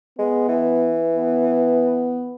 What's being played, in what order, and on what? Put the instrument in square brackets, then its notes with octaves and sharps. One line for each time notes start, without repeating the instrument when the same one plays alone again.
[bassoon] G#3 [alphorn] B3
[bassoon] E3
[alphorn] B3